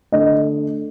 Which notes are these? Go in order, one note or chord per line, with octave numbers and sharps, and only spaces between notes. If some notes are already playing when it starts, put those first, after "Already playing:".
D3 A3 D4 D#5